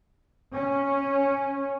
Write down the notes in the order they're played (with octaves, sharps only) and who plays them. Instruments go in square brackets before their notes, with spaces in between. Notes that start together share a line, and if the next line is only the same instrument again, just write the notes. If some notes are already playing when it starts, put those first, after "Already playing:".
[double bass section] C#4